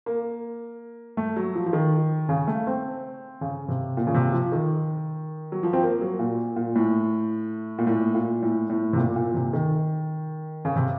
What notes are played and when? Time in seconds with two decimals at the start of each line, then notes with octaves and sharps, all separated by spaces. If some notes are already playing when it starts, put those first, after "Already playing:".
0.06 A#3
1.17 A3
1.36 F#3
1.55 F3
1.66 F3
1.73 D#3
2.29 C#3
2.47 A3
2.67 C4
3.41 C#3
3.68 C3
3.97 A#2
4.07 C#3
4.14 C3
4.33 F3
4.52 D#3
5.52 F#3
5.63 F3
5.73 C4
5.83 A#3
6.01 F#3
6.19 A#2
6.56 A#2
6.75 A2
7.78 A#2
7.87 A2
8.15 A#2
8.42 A2
8.69 A2
8.93 C3
8.97 A#2
9.16 A#2
9.34 C3
9.53 D#3
10.65 C#3
10.76 C3